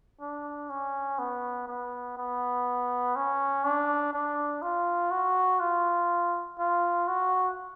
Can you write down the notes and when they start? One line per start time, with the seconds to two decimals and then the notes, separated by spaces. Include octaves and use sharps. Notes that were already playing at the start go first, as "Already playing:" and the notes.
0.21 D4
0.70 C#4
1.19 B3
1.68 B3
2.17 B3
3.16 C#4
3.64 D4
4.13 D4
4.62 F4
5.11 F#4
5.60 F4
6.59 F4
7.08 F#4